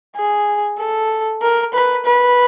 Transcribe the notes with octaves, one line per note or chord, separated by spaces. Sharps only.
G#4
A4
A#4
B4
B4